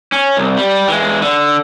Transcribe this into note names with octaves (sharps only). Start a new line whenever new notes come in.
C#4
C2
G3
E3 G#3
D3